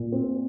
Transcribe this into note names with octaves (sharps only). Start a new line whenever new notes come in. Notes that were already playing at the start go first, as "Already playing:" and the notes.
Already playing: A#2
C4